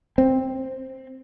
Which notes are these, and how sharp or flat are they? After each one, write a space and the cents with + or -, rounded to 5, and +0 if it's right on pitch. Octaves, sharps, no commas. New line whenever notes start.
C4 +5